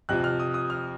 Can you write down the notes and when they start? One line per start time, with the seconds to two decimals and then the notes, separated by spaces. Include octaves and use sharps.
0.09 F2 C3 F3 F#6
0.24 F6
0.40 D#6
0.54 D#6
0.70 F6